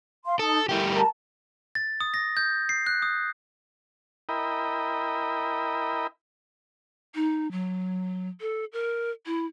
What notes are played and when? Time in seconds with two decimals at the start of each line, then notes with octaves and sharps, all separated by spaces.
0.25 F5 C6
0.39 D#4 A4 A5 D#6
0.69 G3 A3 E4 G4 A#4
0.94 A#4 A5 A#5
1.75 A6
2.01 D#6
2.14 A#6
2.37 G6
2.69 C7
2.87 F#6
3.02 D#6
4.29 E4 A#4 D#5 G5 B5
7.15 D#4
7.52 F#3
8.41 A4
8.73 A#4
9.26 E4